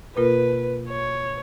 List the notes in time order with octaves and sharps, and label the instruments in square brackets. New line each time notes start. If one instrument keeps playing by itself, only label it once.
[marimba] B2 A#3 F4 A#4 [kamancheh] B4
[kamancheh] C#5